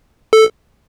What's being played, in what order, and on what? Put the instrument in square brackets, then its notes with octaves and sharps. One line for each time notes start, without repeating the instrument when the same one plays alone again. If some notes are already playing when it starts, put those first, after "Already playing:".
[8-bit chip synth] A4